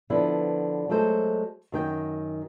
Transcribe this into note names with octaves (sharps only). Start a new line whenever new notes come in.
D3 F3 B3 E4
F#3 G#3 A3 A4 C5
F#2 D#3 G5